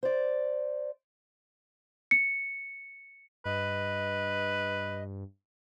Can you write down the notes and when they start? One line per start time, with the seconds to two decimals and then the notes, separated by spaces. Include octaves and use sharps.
0.03 C5 D5
2.11 C#7
3.46 G2 B4 D#5